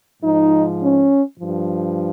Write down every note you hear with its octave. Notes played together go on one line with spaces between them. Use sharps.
G#2 F3 D#4
C#4
G2 F3